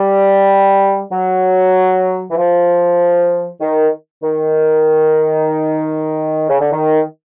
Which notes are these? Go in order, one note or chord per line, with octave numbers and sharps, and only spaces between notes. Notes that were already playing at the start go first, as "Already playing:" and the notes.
Already playing: G3
F#3
E3
F3
D#3
D#3
C#3
D3
D#3